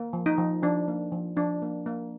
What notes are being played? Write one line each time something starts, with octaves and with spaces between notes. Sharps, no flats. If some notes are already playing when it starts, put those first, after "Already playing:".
Already playing: A#3
F3
D#4
F3
F3 D4
A#3
F3
F3 D4
A#3
A#3